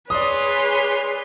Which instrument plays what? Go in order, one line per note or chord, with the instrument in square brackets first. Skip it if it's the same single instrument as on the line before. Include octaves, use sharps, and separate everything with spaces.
[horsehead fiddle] G#4 B4 [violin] C#5 C6 [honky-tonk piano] D5 D#6